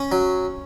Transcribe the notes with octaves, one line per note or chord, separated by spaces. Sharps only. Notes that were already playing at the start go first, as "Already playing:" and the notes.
Already playing: C#4
F#3